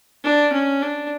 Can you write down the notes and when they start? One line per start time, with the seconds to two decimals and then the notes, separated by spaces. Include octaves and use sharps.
0.24 D4
0.53 C#4
0.82 D4